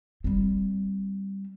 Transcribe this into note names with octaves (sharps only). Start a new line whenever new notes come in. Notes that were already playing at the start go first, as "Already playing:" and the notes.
G3 C4